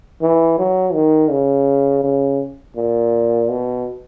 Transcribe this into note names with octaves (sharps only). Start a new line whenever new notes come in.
E3
F#3
D#3
C#3
C#3
A#2
B2